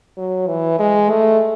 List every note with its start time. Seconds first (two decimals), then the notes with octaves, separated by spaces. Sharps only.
0.17 F#3
0.48 E3
0.79 G#3
1.11 A3